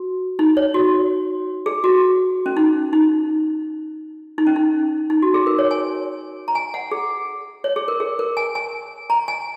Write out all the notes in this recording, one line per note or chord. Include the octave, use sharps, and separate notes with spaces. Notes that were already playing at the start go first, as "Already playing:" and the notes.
Already playing: F#4
D#4
C#5
F#4
G#4
F#4
C#4
D#4
D#4
D#4
C#4
D#4
D#4
F#4
G#4
A#4
C#5
G#5
A#5
G#5
F#5
G#4
C#5
G#4
A#4
G#4
A#4
G#5
G#5
A#5
G#5